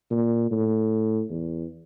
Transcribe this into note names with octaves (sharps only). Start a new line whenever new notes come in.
A#2
A2
E2